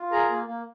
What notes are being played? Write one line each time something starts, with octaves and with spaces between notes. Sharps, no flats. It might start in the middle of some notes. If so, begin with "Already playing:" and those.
Already playing: F4
G#4 A#4 A#5
A#3
A#3